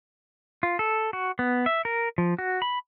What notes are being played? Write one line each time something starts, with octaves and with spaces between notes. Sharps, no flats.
F4
A4
F#4
B3
E5
A#4
F3
F#4
B5